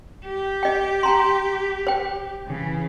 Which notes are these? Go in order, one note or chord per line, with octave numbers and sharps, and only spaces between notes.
G4
D#5 G5
G5 A#5 C6
C5 G5
C#3 E3